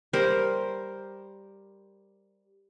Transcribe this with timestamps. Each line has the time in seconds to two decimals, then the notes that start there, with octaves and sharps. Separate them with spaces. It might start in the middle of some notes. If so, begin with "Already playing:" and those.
0.13 G3 A#4 C5